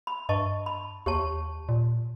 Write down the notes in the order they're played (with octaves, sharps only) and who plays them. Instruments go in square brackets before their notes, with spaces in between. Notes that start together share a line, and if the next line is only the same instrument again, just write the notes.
[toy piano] B5
[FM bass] G2 [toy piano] D#5 A5 C#6
[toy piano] B5
[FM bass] D#2 [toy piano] G4 C#5 A5
[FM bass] A#2